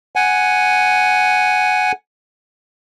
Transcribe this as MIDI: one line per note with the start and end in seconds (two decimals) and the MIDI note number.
0.16 1.92 78
0.16 1.92 80